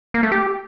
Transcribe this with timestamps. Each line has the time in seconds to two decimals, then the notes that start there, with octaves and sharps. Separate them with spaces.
0.14 A#3
0.23 A3
0.32 G4